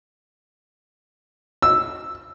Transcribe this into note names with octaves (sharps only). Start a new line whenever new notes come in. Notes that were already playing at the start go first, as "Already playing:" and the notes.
E6